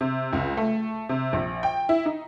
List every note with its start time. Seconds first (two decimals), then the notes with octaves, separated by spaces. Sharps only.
0.01 C3
0.33 C#2
0.57 A3
1.09 C3
1.33 A#1
1.63 G5
1.89 E4
2.06 D#4